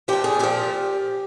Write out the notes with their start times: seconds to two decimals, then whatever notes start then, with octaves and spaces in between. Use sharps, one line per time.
0.08 A#2 F3 G4
0.24 G#4
0.39 A#2 F3 G4